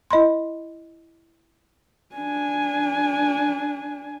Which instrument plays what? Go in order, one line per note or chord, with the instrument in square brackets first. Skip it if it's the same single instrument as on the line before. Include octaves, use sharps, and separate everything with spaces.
[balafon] E4 D#5 B5 C6
[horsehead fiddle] D4 G#5